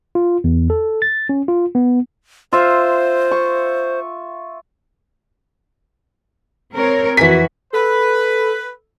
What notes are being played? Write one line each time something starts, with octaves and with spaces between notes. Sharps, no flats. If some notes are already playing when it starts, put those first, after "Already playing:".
F4
E2
A4
A6
C#4
F4
B3
F4 C5 E5
C#6
C4 A#4 C#5
F2 E3 F#4 G#5 B6
A4 B4